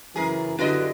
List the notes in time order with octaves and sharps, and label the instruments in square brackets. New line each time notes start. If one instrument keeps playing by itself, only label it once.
[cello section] F#2 C#3 [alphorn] E3 [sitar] G#4 A#4
[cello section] D3 F#3 G4 [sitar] E4 D#5 [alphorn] F#4 [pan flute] B4